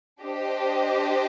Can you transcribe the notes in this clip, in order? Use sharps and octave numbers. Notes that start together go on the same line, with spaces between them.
D4 G4 C5 D#5